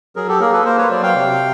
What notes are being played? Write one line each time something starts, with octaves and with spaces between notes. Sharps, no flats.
F#3 G#4 A#4
G4 A4
A#3 G#4 A#4
A4 B4
A#3 A#4 C5
B4 C#5
F#3 C5 D5
F5 G5
C3